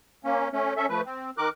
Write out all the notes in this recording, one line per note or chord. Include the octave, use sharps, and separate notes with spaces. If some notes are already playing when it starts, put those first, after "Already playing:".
A#3 C#4
A3 C#4
C#4 A4 E5
F3 A3 B4
C4
D#3 A#4 D6 F#6